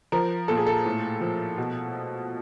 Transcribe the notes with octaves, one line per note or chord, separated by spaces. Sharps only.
F3 A#4
A#2 A4
G#4
A4
A2
F3
B2